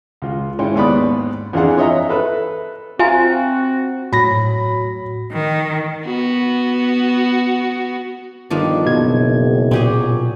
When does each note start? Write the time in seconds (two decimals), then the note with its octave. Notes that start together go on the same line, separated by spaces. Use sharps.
0.22 C#2 F4
0.59 G#2 C#4 E4 G5
0.75 D#2 G#2 B3 D5 B5 D#6
1.53 F2 E3 D4 F4 G#4 F#5
1.78 C#5 D#5 E5 A#5
2.09 A4 B4 E5
2.99 C4 F4 F#4 E5 G#5 A#5
4.13 A2 F#3 B5 A#6
5.32 D#3
6.06 B3 F#4
8.50 G1 D#3 F3 D4
8.86 F#1 B2 G#6
9.71 A#2 F#3 G4 G#4